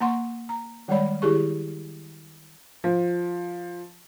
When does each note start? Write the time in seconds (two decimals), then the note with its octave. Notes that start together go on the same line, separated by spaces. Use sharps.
0.01 A#3 F#5 C6 C#6
0.49 A#5
0.88 D#3 G3 G#3 C#5 D5 B5
1.22 D#3 E4 G4 G#4 C#6
2.84 F3